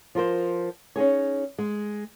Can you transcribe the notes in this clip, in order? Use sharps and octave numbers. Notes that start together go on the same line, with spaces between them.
F3 F4 A#4 C5
C#4 D#4 G#4 C#5
G#3